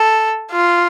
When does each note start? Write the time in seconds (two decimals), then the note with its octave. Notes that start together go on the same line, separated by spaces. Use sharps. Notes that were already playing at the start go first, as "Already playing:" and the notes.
Already playing: A4
0.51 F4